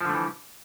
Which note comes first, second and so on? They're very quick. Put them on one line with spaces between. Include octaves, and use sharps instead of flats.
F3 D3 A3 E3